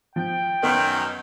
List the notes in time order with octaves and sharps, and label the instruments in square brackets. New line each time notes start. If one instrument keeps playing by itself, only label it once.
[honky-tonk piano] F3 [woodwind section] G5
[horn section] F#2 D#3 [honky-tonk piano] B3